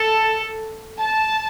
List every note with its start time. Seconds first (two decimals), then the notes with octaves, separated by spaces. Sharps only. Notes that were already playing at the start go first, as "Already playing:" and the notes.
Already playing: A4
0.98 A5